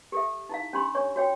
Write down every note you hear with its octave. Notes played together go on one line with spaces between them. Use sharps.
G4 A4 E5
D#4 E4 F5
C#4 D4 G4 B5 C6
D4 C#5 C#6
F#4 C#5 G5